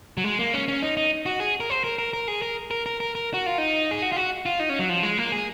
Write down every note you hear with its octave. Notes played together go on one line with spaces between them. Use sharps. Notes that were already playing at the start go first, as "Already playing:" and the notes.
F#3
G#3
A#3
C#4
C#4
D#4
D#4
F#4
G#4
A#4
C5
A#4
A#4
A#4
G#4
A#4
A#4
A#4
A#4
A#4
F#4
F4
D#4
G#4
F#4
F4
F#4
F4
D#4
C#4
F#3
F3
G#3
A#3
G#4